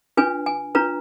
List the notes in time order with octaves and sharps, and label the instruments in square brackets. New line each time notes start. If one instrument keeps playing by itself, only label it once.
[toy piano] D4 F4 B4 G#5
G#5
D4 F4 B4 A#5